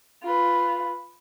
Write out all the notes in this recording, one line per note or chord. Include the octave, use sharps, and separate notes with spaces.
F4 B4